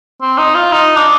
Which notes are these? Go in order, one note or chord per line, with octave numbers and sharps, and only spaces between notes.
C4
D#4
F4
D#4
D4